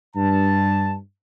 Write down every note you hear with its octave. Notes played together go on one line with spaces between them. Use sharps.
G2 A5